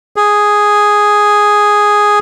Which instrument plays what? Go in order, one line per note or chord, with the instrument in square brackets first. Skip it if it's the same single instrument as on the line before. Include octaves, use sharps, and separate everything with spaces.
[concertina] G#4